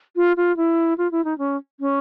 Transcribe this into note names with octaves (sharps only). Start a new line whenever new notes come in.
F4
F4
E4
F4
E4
D#4
C#4
C#4